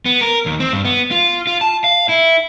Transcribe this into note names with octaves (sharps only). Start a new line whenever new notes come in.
B3
A#4
D#2
C4
G2
B3
F4
F4
A5
F5
E4